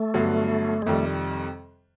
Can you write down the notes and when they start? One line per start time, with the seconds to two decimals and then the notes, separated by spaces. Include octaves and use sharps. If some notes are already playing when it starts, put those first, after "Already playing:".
Already playing: A3
0.14 G2 D3 F#3 B3
0.82 G#3
0.86 F2 C3 D#3 G3 A3